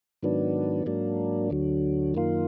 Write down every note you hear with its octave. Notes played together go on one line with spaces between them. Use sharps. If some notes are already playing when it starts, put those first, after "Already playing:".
G#2 D#3 F#3 B3 D4
G#2 F#3 A#3 D4
D2 D3 F#3
F#2 D#3 A#3 F4